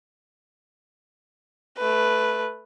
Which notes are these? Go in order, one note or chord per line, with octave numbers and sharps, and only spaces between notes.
A3 B4